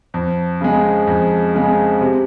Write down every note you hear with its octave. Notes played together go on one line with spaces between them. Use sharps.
F2
C#3 G#3
F2
C#3 G#3
C3